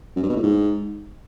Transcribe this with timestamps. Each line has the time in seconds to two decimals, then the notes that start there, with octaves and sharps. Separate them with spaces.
0.16 F#2
0.23 G2
0.29 B2
0.36 A2
0.43 G#2